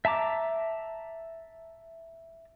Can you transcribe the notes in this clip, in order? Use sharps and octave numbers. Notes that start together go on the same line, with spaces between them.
E5 A5 A#5 D6